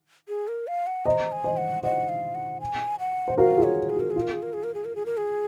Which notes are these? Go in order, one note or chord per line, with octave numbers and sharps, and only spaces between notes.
G#4
A#4
F5
F#5
C5 D#5 A#5
G#5
C5 D#5
F#5
C5 D#5 F#5
F5
F#5
G#5
F#5
C5
F#4 A#4 F5
F4 G#4
C#5
G#4
F#4 A#4
G#4
F4
A#4
G#4
A#4
G#4
A#4
G#4
A#4
G#4
A#4
G#4